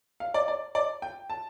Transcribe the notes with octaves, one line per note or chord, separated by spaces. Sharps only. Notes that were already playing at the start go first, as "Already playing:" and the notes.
F5
D5
D5
D5
G5
A5